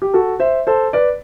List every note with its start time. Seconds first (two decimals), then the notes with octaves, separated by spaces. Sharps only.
0.02 G4
0.14 F#4 A4
0.40 C5 E5
0.67 A4 C5
0.93 B4 D5